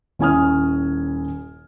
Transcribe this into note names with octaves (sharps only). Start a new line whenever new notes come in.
D#1 C#4 E4 G#5 D#6 F6